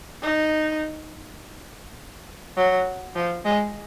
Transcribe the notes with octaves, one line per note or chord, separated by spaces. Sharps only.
D#4
F#3
F3
G#3